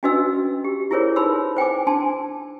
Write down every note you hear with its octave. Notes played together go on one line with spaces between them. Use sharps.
C#4 D4 F#4 B4 D#5 E6
G4
E4 F4 G#4 A#4 C5 C#5
D#4 B4 B5 C6 E6
C5 G5 G#5 D6
D4 G#5 A5 C6